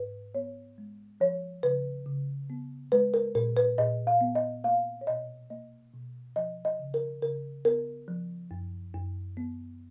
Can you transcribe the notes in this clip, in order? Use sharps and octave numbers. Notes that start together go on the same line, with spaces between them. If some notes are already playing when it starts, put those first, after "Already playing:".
Already playing: G#2 B4
B3 C#5
G#3
F3 C#5
C#3 B4
C#3
B3
G#3 B4
A#4
A#2 A#4
B4
A#2 D#5
F5
B3
D#5
A#3 F5
C#5
B2 D#5
A#3 D#5
B2
F3 D#5
D#5
C#3
A#4
C#3 A#4
B3 A#4
F3
F#2
F#2
B3